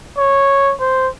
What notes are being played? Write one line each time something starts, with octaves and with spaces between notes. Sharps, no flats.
C#5
C5